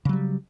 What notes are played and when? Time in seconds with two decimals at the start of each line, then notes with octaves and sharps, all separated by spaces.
0.05 C#3
0.09 F#3
0.13 G3